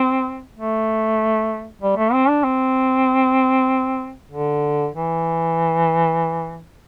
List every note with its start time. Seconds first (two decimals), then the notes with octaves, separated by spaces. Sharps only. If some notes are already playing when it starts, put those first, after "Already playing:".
Already playing: C4
0.57 A3
1.82 G3
1.97 A3
2.13 C4
2.29 D4
2.44 C4
4.31 D3
4.95 E3